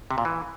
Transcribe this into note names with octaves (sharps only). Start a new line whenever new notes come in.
C3
A#2
E3